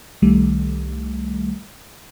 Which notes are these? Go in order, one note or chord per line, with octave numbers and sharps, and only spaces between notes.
C2 D#3 G3 A3